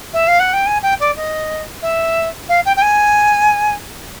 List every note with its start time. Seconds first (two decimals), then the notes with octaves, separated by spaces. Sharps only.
0.13 E5
0.27 F5
0.39 F#5
0.53 G5
0.66 G#5
0.82 G5
0.99 D5
1.16 D#5
1.82 E5
2.49 F5
2.65 G5
2.76 G5
2.82 G#5